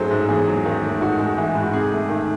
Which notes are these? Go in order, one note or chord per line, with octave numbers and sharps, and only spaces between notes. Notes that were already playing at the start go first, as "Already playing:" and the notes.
Already playing: G#2 F#3 G#3 A3 G#4 A4 C5
G#2
E2 G#4
F#3
D#3
A3
G#2 F#4
G#3
E3
G#2
F#4
C3 G#4
A3
D#3